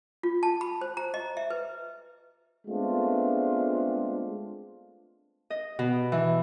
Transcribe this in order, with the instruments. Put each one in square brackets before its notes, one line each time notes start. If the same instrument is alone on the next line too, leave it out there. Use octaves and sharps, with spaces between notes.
[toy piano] F4
A5
B5
C5
A#5
D#5
E5
B4
[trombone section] G#3 A3 B3 C4 D4 F4
[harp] D#5
B2
E3